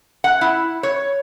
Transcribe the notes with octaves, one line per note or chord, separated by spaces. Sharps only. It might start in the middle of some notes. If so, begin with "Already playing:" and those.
F#5
E4
C#5